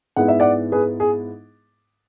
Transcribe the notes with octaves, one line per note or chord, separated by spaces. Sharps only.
G#2 G#3 B3 E4 F#5
E5
D5 F#5
G#4 B4
G#4